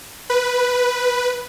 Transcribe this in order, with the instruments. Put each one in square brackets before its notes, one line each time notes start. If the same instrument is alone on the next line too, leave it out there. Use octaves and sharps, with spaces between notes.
[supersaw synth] B4